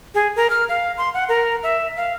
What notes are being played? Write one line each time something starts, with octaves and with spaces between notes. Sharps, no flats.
G#4
A#4
F6
F5
C6
F#5
A#4
E5
F5